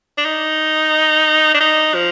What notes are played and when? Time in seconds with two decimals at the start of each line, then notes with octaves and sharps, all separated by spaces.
0.18 D4
0.25 D#4
1.54 D4
1.60 D#4
1.94 F3